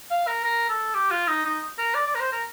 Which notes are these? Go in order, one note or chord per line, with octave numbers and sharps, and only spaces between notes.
F5
A#4
A#4
A4
G4
F4
D#4
D#4
A#4
D5
D5
A#4
C5
A#4